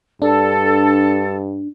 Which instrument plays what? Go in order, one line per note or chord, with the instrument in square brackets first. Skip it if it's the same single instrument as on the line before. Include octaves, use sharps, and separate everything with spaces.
[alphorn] G2 [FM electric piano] D4 [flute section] A4